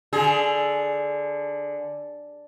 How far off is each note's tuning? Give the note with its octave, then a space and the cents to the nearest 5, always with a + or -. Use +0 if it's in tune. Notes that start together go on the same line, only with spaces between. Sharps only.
D3 +0 G#4 +20